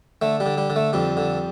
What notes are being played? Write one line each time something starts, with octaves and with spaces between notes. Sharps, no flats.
D3 A3
G3
D3
G3
D3
A3
F2 G3
D3